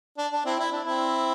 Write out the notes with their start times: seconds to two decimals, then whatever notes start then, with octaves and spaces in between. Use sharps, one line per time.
0.18 D4
0.32 D4
0.45 C4 E4
0.59 E4
0.72 D4
0.85 C4 E4